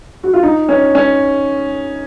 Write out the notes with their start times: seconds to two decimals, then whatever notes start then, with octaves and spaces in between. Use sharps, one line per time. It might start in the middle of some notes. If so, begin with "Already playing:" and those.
0.23 F#4
0.33 F4
0.43 D#4
0.69 C#4
0.95 C#4